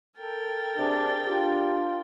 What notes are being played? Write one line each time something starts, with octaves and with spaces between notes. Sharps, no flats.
A4 A#4 G5 A6
C3 D4 G#4
D4 F4 G4